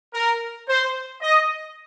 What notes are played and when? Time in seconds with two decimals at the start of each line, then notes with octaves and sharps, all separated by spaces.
0.13 A#4
0.67 C5
1.20 D#5